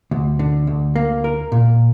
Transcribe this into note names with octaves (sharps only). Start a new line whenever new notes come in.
D2
D3
D2
A#3
A#4
A#2